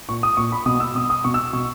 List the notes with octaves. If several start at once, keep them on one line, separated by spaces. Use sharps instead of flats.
A#2 C#6
D#6
A#2 C#6
B5
B2 D#6
E6
B2 D#6
D#6
B2 C#6
E6
B2 C#6